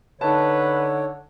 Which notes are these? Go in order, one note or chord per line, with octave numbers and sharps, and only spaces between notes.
D3 D#4 B4 C#5 A5